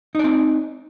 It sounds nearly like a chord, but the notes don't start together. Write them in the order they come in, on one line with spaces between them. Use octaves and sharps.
D#4 D5 C4